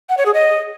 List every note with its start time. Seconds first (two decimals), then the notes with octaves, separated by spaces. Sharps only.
0.09 F#5
0.17 C#5
0.26 G#4
0.34 D#5